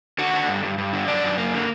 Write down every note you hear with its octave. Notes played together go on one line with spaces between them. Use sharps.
D3 F#4 F#5
D3
G2
G2
G2
D3
F#2 D4 D5
F#2
A#3
D3